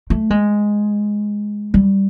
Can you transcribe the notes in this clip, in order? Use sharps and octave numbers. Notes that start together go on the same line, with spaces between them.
A3
G#3
G3